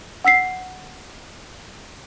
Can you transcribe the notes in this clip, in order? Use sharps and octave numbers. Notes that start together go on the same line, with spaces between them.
F#5 E6 B6 C7